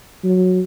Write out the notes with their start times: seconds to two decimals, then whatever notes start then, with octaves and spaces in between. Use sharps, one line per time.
0.24 F#3